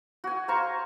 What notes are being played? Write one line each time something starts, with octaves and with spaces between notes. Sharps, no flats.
F#4 G#5
C5 F5 A#5 C#6